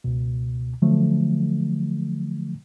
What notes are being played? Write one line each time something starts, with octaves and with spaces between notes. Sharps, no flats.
C#2 B2
D3 F3 F#3 A3